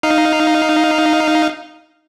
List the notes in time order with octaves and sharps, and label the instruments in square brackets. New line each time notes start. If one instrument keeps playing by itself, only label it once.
[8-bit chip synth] D#4 F5